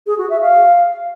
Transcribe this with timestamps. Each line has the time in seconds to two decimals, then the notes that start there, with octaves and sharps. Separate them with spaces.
0.06 G#4
0.18 F#4
0.29 E5
0.41 F5